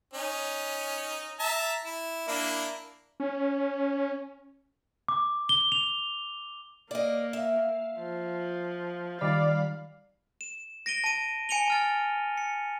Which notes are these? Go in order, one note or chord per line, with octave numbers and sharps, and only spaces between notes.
C#4 D#4
E5 A5 A#5
E4
A#3 D4 E4
C#4
D6
G7
F7
A#3 D5 D#5
E5 F5
F3
D#3 G3 D5 F5 B5
E7
A#6 D7 D#7 G7
A5 D#7
G#5 C#7 D#7 F7 G7
A5 F6 A6
C#7